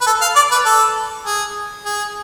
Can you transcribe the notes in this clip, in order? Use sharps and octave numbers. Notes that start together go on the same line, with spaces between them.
B4
A4
F5
D5
B4
A4
G#4
G#4